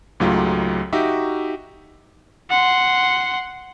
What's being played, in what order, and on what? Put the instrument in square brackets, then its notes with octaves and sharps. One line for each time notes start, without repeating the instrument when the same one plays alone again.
[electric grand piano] C#2 G#2 F#3 A3 F4 G4
D#4 F#4 G4 E5 D6
[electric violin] F#5 C6